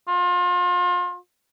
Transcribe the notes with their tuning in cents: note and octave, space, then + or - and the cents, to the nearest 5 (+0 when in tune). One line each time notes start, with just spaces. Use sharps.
F4 +35